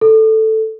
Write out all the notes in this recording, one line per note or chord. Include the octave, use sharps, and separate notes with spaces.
A4